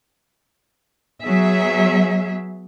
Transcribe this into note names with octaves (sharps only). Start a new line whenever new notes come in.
F#3 B3 G#4 E5